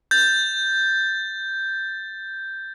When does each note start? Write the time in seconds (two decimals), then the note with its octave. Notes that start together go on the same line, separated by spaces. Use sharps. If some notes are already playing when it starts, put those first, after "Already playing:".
0.11 G6 A6